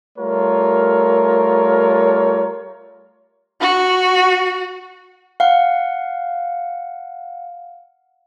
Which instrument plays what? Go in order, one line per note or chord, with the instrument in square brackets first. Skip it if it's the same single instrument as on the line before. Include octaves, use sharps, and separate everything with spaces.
[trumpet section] G3 A3 F4 A#4 C#5
[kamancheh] F#4
[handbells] F5 F#5